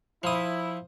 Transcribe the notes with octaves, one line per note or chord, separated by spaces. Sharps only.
F3 E4 D#6